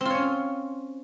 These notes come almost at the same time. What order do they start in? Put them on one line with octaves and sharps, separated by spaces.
C4 F4 C#5 C#4